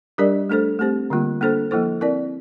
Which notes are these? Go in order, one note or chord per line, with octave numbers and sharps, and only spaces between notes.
G3 D4 G4 A#4 D5
A3 D4 A4 C5
A3 C4 G4 C5
D3 G3 A#3 F4
A#3 D4 A4 C5
F3 A#3 E4 A4 C5
C4 E4 A#4 D5